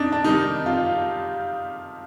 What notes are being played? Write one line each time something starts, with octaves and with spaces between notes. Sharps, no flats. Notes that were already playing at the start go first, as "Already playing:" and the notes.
Already playing: F2 D4 D#4
D4
C3 D#3 G3 D#4
F2 F4